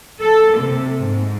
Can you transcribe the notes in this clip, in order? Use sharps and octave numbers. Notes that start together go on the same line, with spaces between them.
A4
C3
G#2